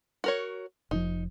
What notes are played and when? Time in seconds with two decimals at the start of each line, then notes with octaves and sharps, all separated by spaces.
0.24 F#4 A#4 C#5
0.91 F1 C3 F3 D#4